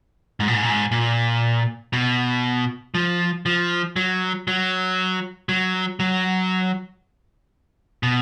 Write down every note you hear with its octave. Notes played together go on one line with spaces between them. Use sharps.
G#2
A#2
G#2
A#2
G#2
A#2
B2
F3
F3
F#3
F#3
F#3
F#3
B2